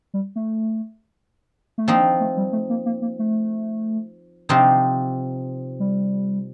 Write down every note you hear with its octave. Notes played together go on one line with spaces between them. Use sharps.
G3
A3
A3
F3 A#3 C4 D#4
A3
G3
A3
A#3
A#3
A#3
A3
C3 F3 C4 D#4
G3